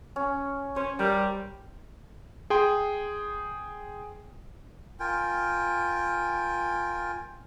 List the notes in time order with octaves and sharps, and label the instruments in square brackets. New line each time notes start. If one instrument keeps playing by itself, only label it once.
[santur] C#4
[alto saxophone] C#4 [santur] C5
[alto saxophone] G3 [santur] A#4
[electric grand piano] G#4 G5 C6
[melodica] F4 A#4 G5 G#5